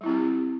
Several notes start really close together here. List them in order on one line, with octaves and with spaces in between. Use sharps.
G3 E4 C4 G4